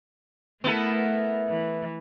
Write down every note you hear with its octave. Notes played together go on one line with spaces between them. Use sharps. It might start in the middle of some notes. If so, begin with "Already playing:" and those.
A3 B3 E4 A4 A#4
E3